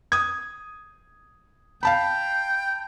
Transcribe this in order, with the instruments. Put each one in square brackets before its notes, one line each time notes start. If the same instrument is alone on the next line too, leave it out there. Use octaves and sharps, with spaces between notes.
[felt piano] D#6 G#6
[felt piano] F5 A5 B5 [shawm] G5